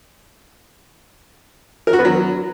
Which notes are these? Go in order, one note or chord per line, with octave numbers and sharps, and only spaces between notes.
A#4
F#4
B3
F#3